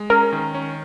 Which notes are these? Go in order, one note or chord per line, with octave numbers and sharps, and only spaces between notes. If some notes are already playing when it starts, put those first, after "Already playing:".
Already playing: G#3
C#4 A#4
D#3
C#4